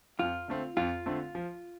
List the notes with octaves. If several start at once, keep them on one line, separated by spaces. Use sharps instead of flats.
F2 F4
D3 A3 C4
F2 F4
D3 A3 C4
F3